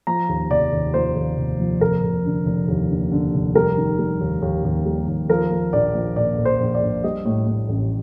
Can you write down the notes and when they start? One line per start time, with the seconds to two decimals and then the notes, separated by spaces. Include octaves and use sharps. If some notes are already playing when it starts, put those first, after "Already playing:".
0.07 F3 A#5
0.29 D#2
0.51 F1 D5
0.72 D#2
0.94 F3 C5
1.16 D#2
1.38 F1
1.59 F3
1.81 F1 A#4
2.03 F1
2.25 D3
2.46 F1
2.68 D#2
2.90 D3
3.12 D3
3.34 F1
3.55 G3 A#4
3.77 D#3
3.99 G3
4.21 D#2
4.42 D#2
4.64 D#2
4.86 G3
5.07 D#2
5.29 F3 A#4
5.51 F3
5.73 A#1 D5
5.95 F3
6.16 A#2 D5
6.38 A#1
6.45 C5
6.60 A#1
6.75 D5
6.82 A#1
7.04 G3 D#5
7.25 A2
7.47 A2
7.69 A1